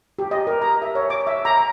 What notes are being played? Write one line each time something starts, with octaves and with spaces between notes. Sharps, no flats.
G4
D#5
A#4
A#5
E5
C#5
D6
E5
A#5
A#5